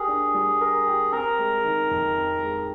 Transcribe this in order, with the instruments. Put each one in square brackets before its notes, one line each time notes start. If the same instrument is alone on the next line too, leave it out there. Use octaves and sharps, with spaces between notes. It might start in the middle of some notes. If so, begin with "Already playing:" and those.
Already playing: [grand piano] G4 A#4 [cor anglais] G#4
[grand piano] D4
G3
A#4
G4
[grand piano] C4 [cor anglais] A#4
[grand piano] G#3
D#3
F2
C4
G#3